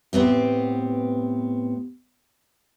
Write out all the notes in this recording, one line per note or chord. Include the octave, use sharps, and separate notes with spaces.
A2 B3 C4 G4